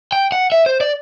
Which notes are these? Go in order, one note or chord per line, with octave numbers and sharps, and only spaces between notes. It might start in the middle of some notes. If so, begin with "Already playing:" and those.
G5
F#5
E5
C5
D5